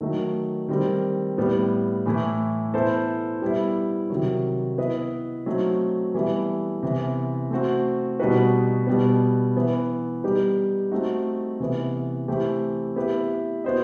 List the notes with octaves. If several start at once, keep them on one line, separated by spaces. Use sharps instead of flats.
D#3 F#3 A3 D#4
D#3 G3 C4
A2 G3 B3
A2 E3 A3 E4
B3 E4 A4 C5
G3 B3 E4
C3 D#3 F#3
B3 E4 B4 D#5
F#3 A3 C4 D#4
E3 G3 B3 E4 A4
C3 E3 B3
A3 C4 F#4
B2 G3 D#4 F#4 B4
B2 G3 B3
E3 B3 E4
G3 B3 D#4 G4
A3 C4 D#4 F#4
C3 E3 B3
E3 A3 C4 E4 G4
B3 E4 G4 B4 E5
B3 F#4 C5 D#5